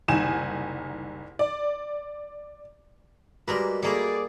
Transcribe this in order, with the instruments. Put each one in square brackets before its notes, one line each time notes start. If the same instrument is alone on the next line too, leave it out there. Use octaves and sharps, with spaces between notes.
[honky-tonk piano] F#1 C2 D#3 G#5 E7
D5
[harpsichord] G3 A#3 [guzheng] G#3 A#4 B4 [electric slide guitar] F#4 G4
[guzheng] G3 A#3 A#5 [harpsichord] A3 E4 [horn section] G#4 D5